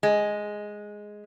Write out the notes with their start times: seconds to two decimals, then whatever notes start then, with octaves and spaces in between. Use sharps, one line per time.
0.03 G#3